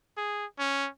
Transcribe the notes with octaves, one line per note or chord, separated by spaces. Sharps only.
G#4
C#4